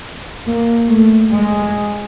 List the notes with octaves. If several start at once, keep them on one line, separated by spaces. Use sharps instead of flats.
A#3
A3
G#3